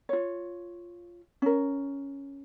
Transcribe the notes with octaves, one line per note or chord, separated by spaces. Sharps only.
F4 C#5
C#4 A#4